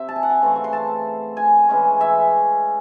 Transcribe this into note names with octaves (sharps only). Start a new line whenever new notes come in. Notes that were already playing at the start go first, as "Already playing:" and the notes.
Already playing: C3 E5
A5
G#5
F#5
G#5
C#3 E3 A3 C4
C#6
C6
A5
G#5
E3 G#3 C#4
E5